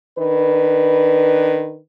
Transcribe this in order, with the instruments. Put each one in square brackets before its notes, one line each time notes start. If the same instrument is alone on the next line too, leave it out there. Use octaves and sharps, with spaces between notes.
[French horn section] D#3 D4 B4